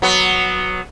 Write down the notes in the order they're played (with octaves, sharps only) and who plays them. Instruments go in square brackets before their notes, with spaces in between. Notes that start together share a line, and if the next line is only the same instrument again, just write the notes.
[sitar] F#3 B3